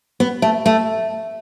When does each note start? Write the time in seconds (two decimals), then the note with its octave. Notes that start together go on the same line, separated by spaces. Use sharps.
0.20 B3
0.42 A3
0.66 A3